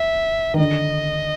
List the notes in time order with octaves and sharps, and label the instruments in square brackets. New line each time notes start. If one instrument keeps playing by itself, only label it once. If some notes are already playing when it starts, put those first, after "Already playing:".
Already playing: [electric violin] E5
[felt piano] D#3
[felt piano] D3 [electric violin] D#5